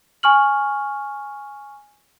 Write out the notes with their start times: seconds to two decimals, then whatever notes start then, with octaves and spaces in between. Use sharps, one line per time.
0.23 G#5 C#6 F6 F#7